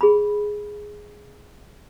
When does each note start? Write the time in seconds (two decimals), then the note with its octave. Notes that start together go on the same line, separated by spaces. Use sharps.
0.01 G#4 B5